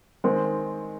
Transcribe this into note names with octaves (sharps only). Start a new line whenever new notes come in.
D#3 G#3 C4